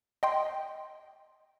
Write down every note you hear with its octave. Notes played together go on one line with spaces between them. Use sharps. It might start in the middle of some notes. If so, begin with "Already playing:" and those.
D#5 G5 C6